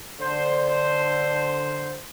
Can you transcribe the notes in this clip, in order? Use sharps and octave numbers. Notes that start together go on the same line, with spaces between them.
D3 C5